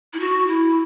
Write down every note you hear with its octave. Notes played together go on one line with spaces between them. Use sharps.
E4
F#4
E4